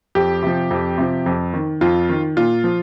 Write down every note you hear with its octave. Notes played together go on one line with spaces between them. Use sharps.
F2 G4
C3 F3
F2
C3 F3
F2
D#3
F2 F4
D#3
A#2 F4
F3